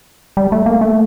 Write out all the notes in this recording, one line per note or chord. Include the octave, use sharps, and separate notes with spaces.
G3
A3
A#3
A3